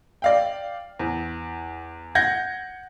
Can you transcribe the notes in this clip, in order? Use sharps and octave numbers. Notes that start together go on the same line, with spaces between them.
D5 F5 G5
E2
F#5 G6 G#6 A#6